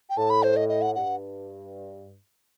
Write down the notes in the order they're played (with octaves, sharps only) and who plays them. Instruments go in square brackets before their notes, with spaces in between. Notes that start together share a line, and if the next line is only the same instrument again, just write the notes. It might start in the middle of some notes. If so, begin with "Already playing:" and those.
[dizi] G5
[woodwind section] A2 [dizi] A5
[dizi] B5
C5
D#5
D#5
F#5
[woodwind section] G2 [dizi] F#5